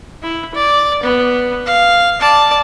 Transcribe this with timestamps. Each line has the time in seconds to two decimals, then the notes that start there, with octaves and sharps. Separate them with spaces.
0.23 E4
0.55 D5
1.03 B3
1.66 F5
2.20 D5 A5